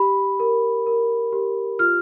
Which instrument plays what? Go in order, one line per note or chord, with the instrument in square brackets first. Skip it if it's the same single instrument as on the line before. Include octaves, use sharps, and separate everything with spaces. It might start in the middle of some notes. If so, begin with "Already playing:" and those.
Already playing: [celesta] G4 B5
A#4
A#4
G4
F4 F6